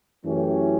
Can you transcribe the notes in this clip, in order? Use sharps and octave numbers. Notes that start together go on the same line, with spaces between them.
F#2 E3 A3 C#4 G4